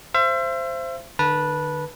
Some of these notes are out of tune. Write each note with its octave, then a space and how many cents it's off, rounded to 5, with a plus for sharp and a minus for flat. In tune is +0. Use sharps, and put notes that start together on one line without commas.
C5 +0 E5 +40
D3 +30 B4 -15 A5 +0